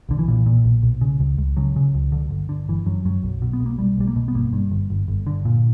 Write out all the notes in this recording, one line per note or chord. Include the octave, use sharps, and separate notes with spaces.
B1 D3
E3
A#2
A#2
B1
B1
C#3
C#2
C#2
C#3 F#3
C#3
C#2
D3
G1
D3
G1 E3
F#2 F#3
F#2 F#3
B1
B2
B3
B1
A#3
B1 G3
B1 G3
A#3
B2
B3
G1 A#3
G2
G1
G1
G1
D3
A#2